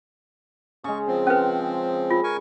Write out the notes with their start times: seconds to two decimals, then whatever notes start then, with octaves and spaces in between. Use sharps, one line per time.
0.84 C#3 G#3 C#6
1.07 F3 C4
1.27 C#4 B4 F#5
2.10 F4
2.24 A#4 G#5 C#6